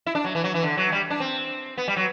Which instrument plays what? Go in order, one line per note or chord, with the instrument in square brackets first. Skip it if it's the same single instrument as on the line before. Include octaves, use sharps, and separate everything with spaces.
[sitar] E4
D4
F#3
E3
F#3
E3
D3
F#3
G3
D4
C4
B3
G3
F#3